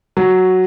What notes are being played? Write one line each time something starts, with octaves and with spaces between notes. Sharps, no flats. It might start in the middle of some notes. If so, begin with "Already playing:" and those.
F#3